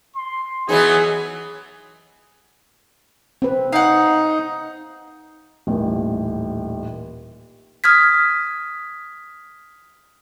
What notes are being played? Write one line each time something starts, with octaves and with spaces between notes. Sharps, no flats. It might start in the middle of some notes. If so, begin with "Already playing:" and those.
C6
E3 F#3 B3 D#4 G#4
C4 B4
D#4 F5 F#5
D#1 A1
D#6 F6 G#6 B6